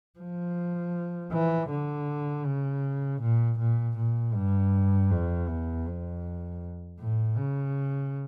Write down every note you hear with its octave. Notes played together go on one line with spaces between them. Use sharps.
F3
E3
D3
C#3
A#2
A#2
A#2
G2
F2
E2
F2
A2
C#3